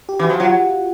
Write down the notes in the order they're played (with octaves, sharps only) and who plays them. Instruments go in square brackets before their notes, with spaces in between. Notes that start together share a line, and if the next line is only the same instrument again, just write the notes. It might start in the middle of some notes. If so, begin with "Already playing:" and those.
[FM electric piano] G4
[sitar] E3
[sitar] F3 [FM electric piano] F#4
[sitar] F#3 [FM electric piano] F4